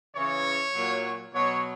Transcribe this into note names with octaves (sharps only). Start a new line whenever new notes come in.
C#3 E3 C#5
A#2 F#3
B2 F#3 C#5